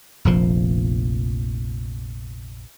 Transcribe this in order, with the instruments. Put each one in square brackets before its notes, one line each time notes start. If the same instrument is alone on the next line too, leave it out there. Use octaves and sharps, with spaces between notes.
[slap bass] F1 A#1 F3